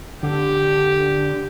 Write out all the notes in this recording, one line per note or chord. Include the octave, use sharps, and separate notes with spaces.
D3 G4